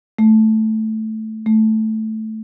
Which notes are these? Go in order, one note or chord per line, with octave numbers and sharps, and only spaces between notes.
A3
A3